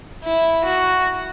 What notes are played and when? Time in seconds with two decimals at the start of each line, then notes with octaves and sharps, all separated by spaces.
0.24 E4
0.65 F#4